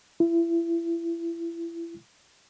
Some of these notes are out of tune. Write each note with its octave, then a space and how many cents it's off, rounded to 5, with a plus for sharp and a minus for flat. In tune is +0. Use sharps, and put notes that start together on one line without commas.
E4 +30